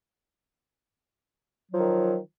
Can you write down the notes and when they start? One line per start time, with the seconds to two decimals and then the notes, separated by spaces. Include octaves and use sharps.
1.70 F#3
1.74 F3
1.79 D#3